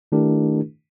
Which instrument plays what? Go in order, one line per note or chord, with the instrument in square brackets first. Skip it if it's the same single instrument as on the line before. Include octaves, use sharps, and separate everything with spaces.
[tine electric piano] D#3 A3 D4 E4 G4 A#4